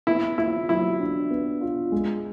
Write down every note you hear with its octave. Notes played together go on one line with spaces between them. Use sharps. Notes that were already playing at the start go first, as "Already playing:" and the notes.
B3 E4
E4 F4
F#3 E4
D4
B3
F4
G#3